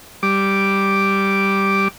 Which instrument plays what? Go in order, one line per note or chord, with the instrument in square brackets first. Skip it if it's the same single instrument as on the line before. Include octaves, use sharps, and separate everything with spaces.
[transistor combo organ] G3 D6